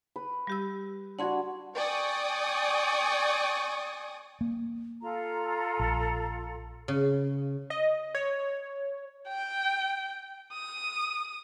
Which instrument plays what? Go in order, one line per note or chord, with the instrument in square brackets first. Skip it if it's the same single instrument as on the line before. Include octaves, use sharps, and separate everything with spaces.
[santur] B4
[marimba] G3 G4 E6
[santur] D4 F#4 [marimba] F#5 C6 G#6
[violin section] D5 G5 G#5 C#6 D#6
[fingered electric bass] A#3
[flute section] F4 A4 A#5
[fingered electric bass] A#1
[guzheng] C#3
[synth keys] D#5
C#5
[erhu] G5
D#6